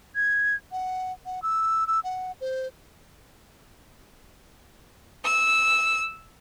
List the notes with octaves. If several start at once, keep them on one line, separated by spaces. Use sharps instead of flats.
G#6
F#5
F#5
E6
E6
F#5
C5
E6